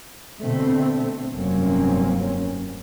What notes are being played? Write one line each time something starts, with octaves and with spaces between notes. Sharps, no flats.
B2 D3 A3 C4
F1 G2 F#3 A#3 C4 C#4